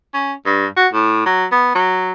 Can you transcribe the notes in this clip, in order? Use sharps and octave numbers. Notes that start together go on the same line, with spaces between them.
C#4
G2
F#4
A2
F#3
B3
F#3